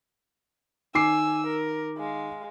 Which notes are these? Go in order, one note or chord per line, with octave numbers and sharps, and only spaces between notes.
D#3 G#5 D6 E6 C7
A#4
G#3 F5